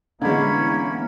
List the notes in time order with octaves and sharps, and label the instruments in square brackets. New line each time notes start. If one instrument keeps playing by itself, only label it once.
[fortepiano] D3 G#3 [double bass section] E3 B3 [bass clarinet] A#3 [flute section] C#4 B5 G#6